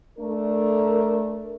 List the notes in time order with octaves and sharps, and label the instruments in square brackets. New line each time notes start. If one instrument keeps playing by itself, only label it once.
[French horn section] A3 D4 A#4